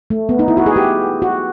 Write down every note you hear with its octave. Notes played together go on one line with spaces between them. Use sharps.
A3
B3
D#4
E4
F#4
G#4
G4
F#4